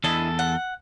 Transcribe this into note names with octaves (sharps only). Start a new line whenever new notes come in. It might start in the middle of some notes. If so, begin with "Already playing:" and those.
E2 D4 E4 A4 D#5
F#5